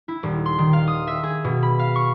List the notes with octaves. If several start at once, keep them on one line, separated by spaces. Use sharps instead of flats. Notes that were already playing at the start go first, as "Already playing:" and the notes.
E4
D#1
C6
D#3
F5
D#6
E5
G#4
B2
B5
F5
C#6